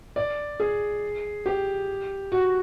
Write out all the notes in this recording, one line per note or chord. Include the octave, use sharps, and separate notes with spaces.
D5
G#4
G4
F#4